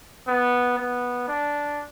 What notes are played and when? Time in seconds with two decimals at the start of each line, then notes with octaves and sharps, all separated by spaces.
0.27 B3
0.78 B3
1.28 D4